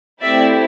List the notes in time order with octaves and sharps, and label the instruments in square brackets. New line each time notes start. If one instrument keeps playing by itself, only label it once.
[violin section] A3 C4 E4 G4 D5 E5